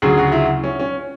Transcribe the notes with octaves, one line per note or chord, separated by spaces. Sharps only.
D2 C#3 F#3 G#4
F#4
E4
C#4
C#4